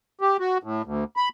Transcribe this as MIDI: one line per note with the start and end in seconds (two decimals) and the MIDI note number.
0.21 0.37 67
0.40 0.58 66
0.63 0.82 45
0.85 1.04 38
1.17 1.29 83